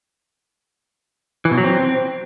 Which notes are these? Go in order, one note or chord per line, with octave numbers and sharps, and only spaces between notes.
E3
B2
F#3
C4